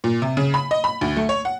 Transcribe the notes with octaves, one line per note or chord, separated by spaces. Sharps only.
A#2
C3
C#3
B5
D#5
B5
D2
A3
C#5
F#5